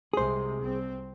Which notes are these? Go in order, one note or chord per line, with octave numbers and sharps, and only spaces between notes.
C2 C3 G#3 G#4 C5
C2 C4